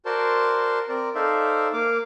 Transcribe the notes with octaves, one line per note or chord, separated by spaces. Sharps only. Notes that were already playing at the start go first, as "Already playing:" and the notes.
F#4 A#4 C5 D5 A5 C6
C4 A#4 D5
D#4 A4 C5 D5 E5 F5
A#3 F5 D6